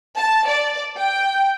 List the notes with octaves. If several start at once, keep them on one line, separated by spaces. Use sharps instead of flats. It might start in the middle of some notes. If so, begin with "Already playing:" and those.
A5
D5
G5